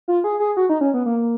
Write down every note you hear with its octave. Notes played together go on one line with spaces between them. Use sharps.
F4
G#4
G#4
F#4
D#4
C#4
B3
A#3